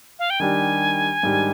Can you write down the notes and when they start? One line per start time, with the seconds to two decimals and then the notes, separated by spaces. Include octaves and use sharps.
0.19 F5
0.30 G5
0.40 D#3 G3 D4 G4 G#5
1.23 G#2 D#3 G3 D4 G4